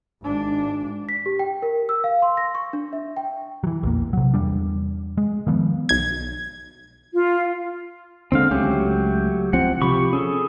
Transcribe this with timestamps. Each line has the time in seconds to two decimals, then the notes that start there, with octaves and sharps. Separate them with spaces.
0.22 G#1 D4
1.09 B6
1.26 G4
1.39 G5
1.62 A#4
1.89 E6
2.04 F5
2.22 C6
2.37 A#6
2.55 C#6
2.73 D4
2.93 E5
3.17 G5
3.64 E3 F#3
3.83 A#1 E2 A#3
4.13 C3 F#3
4.34 E2 G3 D4
5.18 G#3
5.47 D#3 F3 B3
5.89 B1 G#6
7.13 F4
8.32 D#2 D3 G#3 C4 F5
8.51 C#2 F#3 A3 C#4 G4
9.53 C#2 F3 C4 F#5
9.82 C3 F3 G4 B5 C#6
10.13 C#4 G#4 A4